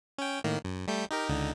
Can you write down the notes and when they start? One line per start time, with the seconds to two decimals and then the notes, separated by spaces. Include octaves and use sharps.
0.18 C#4 G5
0.44 A2 D#3 A#3
0.65 F#2
0.87 G3 A3 G6
1.11 D#4 G4 A#4
1.29 C#2 D3 D#4